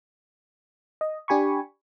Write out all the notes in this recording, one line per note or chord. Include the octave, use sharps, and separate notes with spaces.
D#5
D4 G4 G#5 B5 C#6